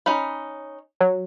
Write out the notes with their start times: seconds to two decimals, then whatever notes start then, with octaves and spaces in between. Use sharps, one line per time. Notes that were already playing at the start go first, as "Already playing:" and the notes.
0.06 C#4 D#4 B5
1.01 F#3